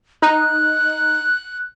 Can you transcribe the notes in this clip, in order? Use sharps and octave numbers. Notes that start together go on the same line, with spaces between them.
D#4 F#6